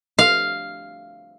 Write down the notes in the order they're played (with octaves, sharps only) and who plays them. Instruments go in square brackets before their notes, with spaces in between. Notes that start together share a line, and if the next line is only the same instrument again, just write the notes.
[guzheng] F5